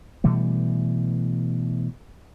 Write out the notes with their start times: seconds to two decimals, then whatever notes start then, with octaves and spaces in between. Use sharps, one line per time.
0.24 B2 E3 G3 A3